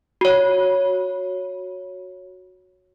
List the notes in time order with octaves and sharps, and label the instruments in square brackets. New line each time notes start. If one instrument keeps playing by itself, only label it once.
[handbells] F#4 C#5